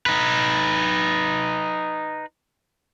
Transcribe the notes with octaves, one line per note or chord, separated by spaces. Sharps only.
D#4 B4